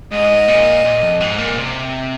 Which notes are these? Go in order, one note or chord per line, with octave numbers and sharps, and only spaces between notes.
G#2 D#5
A#2
A#2
F2
G#2
A#2
C3